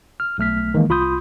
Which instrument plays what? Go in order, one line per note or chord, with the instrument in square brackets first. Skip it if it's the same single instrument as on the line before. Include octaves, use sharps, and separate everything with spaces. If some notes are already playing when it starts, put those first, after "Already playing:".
[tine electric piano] F6
B1 A3 F6 B6
D#3 E3 G#3 A#3
C2 F4 B5 C6 D#6 G6